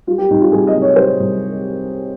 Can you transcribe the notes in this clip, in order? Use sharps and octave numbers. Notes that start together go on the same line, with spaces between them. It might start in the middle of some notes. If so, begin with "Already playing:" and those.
G3 F4
G4
C2 D#4
F4
C2 G#4
D#5
C3
C#5
G3 C5
C2